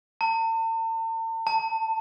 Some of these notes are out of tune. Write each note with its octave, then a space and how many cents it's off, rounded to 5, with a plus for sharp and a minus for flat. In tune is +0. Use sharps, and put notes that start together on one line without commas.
A5 +45
A5 +20